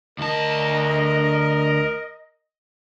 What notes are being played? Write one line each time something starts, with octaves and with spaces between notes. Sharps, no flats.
D2 A#4 D#5 A5